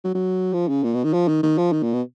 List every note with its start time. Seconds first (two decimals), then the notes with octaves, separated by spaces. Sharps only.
0.04 F#3
0.14 F#3
0.53 F3
0.68 C#3
0.84 A#2
0.94 B2
1.04 D#3
1.13 F3
1.28 D#3
1.43 D#3
1.58 F3
1.72 D#3
1.83 A#2
1.93 B2